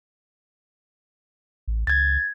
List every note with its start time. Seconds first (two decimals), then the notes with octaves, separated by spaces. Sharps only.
1.68 A1
1.87 C#2 G#6 A6